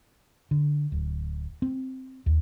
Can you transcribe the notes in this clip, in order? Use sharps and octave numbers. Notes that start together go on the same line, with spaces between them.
D3
D1
C4
D#2